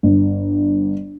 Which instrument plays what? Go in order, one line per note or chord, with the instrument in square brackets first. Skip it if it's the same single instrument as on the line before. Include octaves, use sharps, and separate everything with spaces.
[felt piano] G1